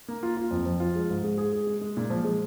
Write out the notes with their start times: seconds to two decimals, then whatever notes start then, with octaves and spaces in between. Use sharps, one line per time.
0.08 A#3
0.23 F4
0.37 F4
0.51 F2
0.66 F3
0.80 F4
0.95 G#3
1.10 G#2
1.24 G#3
1.38 G#4
1.53 G#4
1.67 G#3
1.81 G#3
1.97 A#2
2.10 F3
2.25 G#3